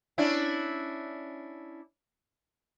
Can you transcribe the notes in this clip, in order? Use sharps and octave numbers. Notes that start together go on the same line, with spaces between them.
C#4 D4 E4